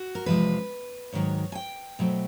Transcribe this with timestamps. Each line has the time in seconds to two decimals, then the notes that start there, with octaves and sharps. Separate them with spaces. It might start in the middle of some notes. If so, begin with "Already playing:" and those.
Already playing: F#4
0.15 A#4
0.26 E2 C3 F3 G#3 B4
1.13 G#2 D#3 F#3 C#5
1.52 G#5
1.55 G5
1.99 B2 F#3 A3 C4